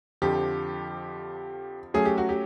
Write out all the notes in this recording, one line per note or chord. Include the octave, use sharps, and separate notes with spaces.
F2 D3 F3 G4
F#3 A3 C#4 G#4
G4
F#4
G4